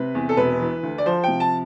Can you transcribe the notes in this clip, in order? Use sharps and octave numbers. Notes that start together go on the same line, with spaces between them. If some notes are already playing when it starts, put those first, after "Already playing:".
Already playing: C3 B4
E2
A4
E1 B4
E3
D2
D5
F3 C5
C3 G5
A5